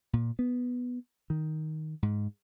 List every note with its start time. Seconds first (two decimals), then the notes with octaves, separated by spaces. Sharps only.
0.13 A#2
0.39 B3
1.30 D#3
2.03 G#2